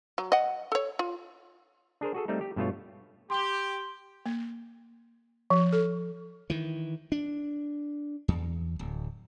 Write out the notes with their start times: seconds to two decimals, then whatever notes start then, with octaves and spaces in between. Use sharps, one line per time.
0.18 F#3
0.32 D#5 F#5
0.72 A4 C#5
0.99 F4
2.01 D4 G#4 A#4 C5
2.14 F#4 G#4 A4
2.28 G3 A3 C4 D#4
2.41 G4
2.56 G2 B2 A3 F4 C#5
3.30 G4 C6 G7
4.26 A#3
5.50 F3
5.73 A4
6.50 D#3 E3
7.12 D4
8.28 E2
8.79 D1